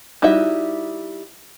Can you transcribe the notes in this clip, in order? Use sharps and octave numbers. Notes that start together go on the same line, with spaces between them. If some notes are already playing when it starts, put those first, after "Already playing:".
G3 D#4 E4 F#4 E5